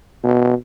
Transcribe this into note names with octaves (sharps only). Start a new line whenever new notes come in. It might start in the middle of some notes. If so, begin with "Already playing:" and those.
B2